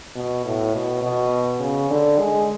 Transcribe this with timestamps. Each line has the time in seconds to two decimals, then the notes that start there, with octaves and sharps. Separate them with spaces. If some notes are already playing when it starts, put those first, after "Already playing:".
0.15 B2
0.45 A2
0.74 B2
1.02 B2
1.60 C#3
1.90 D3
2.19 G#3